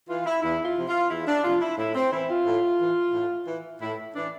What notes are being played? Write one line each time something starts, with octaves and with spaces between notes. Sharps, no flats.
E3 F4
E4
E2 E4
F4
C3 F3
F4
E2 E4
D4
C3 F3 F4
E4
A2 E4
C4
E3 E4
F4
A2
E3
A2
E3
A2 E4
E3 D4